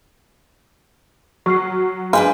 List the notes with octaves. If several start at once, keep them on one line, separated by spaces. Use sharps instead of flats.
F#3 C#6 F6 C7
G#3 D4 F4 B4 G5 G#5